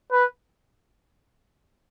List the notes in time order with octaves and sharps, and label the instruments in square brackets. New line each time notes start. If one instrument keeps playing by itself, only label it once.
[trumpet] B4